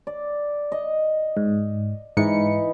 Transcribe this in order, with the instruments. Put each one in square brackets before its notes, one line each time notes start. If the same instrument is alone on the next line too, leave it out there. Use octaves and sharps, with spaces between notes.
[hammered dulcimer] D5
D#5
[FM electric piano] G#2
[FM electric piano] G#2 C#7 [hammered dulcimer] E3 D#4